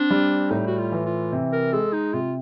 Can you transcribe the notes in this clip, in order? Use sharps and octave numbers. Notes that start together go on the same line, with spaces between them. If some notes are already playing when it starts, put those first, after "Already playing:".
Already playing: C4 D4
G3
A2 D#4
F#4
F4
E3
F4
C3
A#4
G#3 A4
D#4
C3 F4